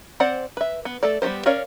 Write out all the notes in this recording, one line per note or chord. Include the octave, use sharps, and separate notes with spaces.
C4 C5 D5 F#5
B4 E5
B3
A3 A4 D5
G3 B3 F4 G4 C5
C#4 A#4 C#5 D5 F5